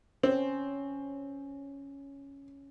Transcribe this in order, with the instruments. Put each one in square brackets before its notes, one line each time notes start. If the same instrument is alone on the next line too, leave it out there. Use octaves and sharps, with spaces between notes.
[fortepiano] C4 [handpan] C#4